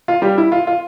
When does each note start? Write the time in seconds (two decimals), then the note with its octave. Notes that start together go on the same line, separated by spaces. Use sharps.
0.08 F4
0.22 G3 G4
0.38 E4
0.52 F4
0.67 F4